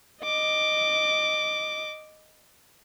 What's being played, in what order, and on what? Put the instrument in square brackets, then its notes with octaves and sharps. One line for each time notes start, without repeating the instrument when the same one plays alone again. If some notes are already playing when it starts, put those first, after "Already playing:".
[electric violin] D#5 D6